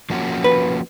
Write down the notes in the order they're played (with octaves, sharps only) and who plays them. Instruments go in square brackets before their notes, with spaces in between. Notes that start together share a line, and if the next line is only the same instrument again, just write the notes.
[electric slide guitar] F3 A#3 C#4 F#4
[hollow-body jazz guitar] B4